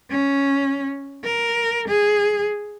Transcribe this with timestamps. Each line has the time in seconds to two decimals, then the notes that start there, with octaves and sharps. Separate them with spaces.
0.10 C#4
1.24 A#4
1.88 G#4